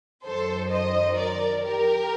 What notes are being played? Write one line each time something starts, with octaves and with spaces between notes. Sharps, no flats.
F#2 D#3 F#3 A4 C5
C5 D#5
A#4 D5
G4 A#4